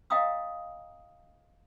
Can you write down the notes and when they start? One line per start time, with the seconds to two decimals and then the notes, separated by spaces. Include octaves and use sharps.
0.10 D#5 F5 G5 A#5 D#6 E6